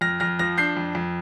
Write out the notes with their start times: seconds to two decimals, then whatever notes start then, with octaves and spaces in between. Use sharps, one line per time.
0.01 F2 F6 A#6
0.20 F2 F6 A#6
0.39 F3 F6 A#6
0.58 D4 G6 C7
0.77 F2
0.95 F2